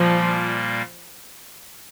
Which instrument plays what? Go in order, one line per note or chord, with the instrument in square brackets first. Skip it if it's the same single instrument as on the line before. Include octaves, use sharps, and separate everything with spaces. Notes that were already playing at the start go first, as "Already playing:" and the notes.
Already playing: [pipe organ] A#2 G3 A#3 [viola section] F3